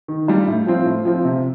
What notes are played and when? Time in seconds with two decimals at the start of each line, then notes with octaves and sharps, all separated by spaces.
0.08 D#3
0.27 G3 D4 F4
0.47 A2
0.66 F3 C4 F4
0.86 A2
1.05 F3 C4 F4
1.25 C3